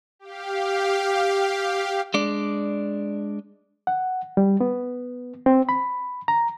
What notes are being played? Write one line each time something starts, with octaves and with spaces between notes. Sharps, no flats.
G4 F5
G#3 D4 D5
F#5
G3
B3
C4
B5
A#5